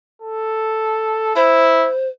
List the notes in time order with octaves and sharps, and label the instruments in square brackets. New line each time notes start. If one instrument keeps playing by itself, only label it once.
[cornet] A4
[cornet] E4 [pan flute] C5